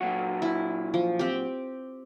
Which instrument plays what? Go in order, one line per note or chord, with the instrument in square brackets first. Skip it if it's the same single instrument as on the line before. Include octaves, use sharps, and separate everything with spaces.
[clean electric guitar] A#2 F#3 F#4
[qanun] E4
F3
C4 G4